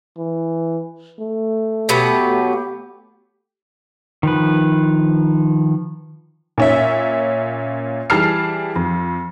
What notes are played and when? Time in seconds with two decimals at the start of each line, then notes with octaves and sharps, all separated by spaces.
0.18 E3
1.20 A3
1.89 B2 F#3 B3 G4
4.23 D#3 F3 B4
6.58 A#2 C#4 E5
8.10 E3 G3 G#4 A5 F6 C7
8.76 F2